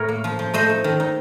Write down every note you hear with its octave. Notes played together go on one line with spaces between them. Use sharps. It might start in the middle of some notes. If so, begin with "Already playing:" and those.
Already playing: A2 A#4 C#5
A#3
F3
F3
A3 C5 D#5
D#4
D#3
D#4